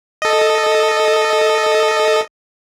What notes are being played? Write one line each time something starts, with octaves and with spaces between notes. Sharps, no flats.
A4 D#5